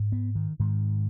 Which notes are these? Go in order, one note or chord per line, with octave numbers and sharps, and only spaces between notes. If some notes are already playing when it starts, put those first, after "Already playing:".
Already playing: G#2
B3
D#3
G#2 D#3